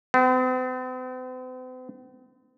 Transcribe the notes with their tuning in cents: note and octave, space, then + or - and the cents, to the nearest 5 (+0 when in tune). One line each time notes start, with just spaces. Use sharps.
C4 -45